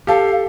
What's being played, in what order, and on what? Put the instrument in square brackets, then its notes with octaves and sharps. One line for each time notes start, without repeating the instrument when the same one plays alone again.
[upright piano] G4 A4 [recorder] F5